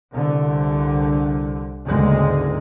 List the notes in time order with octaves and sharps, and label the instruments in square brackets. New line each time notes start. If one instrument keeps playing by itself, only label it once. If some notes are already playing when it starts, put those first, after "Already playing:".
[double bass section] C2 D3
F#1 D2 G#2 G#3